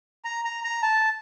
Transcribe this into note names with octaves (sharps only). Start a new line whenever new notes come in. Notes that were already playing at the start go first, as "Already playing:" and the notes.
A#5
A#5
A#5
A5